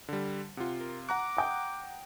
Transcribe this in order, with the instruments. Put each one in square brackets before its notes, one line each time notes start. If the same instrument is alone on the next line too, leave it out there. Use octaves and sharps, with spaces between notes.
[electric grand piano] D3 G3
[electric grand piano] C3 F4 [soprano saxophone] F#5
[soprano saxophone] A#4
[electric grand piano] F#5 A#5 F#6 [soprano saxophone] D6
[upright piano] G5 D#6